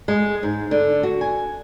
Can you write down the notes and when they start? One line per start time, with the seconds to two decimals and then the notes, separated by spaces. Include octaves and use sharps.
0.08 G#3
0.43 G#2
0.71 D3
1.03 F#4
1.21 G#5